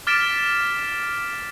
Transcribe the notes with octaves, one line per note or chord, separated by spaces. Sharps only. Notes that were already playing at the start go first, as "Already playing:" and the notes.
D6 F6 A6 B6 D7 E7